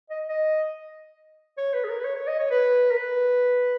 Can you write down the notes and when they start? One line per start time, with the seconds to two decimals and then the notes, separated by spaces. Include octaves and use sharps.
0.10 D#5
0.29 D#5
1.58 C#5
1.73 B4
1.84 G#4
1.89 A#4
1.99 B4
2.04 C#5
2.16 C#5
2.28 D#5
2.39 C#5
2.51 B4
2.91 A#4
2.97 B4